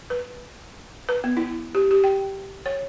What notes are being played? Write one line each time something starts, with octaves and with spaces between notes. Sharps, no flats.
B4
B4
B3
E4
G4
G4
G5
C#5